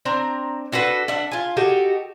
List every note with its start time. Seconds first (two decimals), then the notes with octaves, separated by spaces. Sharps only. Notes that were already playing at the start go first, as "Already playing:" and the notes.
0.05 C4 D4 A#5
0.72 D4 F#4 A4 B4
1.08 D4 E5 F#5
1.31 F4 G#5
1.57 D#4 F#4 G4 A4